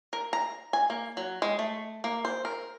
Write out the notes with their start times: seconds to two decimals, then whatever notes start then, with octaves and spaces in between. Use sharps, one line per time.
0.13 A#4
0.33 A#5
0.73 G#5
0.90 A#3
1.17 F#3
1.42 G#3
1.59 A3
2.04 A#3
2.25 C5
2.45 A#4